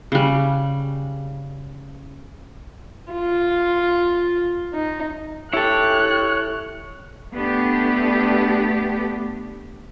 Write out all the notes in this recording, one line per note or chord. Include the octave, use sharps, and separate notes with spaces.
C#3 G3
F4
D#4
E4 G4 A4 C#5 F#6
A3 B3 D4 G4